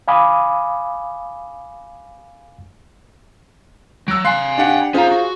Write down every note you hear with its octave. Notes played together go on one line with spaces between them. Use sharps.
F5 G#5 B5 D6 D#6
F#3 E6 D7
F5 G#5 C6 F#6 C7
D4 G4 F#5
C#4 F4 G#4 C5 A#5
F#4